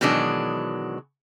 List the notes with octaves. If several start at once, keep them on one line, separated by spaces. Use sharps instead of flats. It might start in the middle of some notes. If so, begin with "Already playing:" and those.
B2 D#3 E3 F#3 G#3 D4